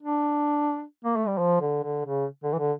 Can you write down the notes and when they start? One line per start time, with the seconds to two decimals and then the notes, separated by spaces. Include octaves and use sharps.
0.03 D4
1.04 A#3
1.16 A3
1.27 G3
1.38 F3
1.61 D3
1.84 D3
2.05 C#3
2.44 D3
2.53 E3
2.59 D3